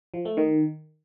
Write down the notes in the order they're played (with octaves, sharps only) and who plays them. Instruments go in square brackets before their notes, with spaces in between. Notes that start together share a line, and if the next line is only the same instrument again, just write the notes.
[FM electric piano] F3
A3
D#3